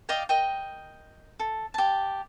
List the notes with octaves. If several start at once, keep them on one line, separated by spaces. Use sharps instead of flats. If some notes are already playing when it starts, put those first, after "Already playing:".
D5 D#5 F5 G5
A#4 D#5 G5
A4
G4 A5